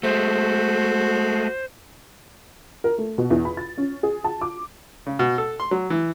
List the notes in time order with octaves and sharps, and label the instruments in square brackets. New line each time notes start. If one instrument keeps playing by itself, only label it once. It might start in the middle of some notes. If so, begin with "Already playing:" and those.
[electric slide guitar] G#3 A3 [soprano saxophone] F#4 [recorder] C5
[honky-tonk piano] A#4
A3
B2
E2
B5
A6
C#4
G#4
A5
D6
[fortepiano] C#3
B2
A4
C6
F#3
E3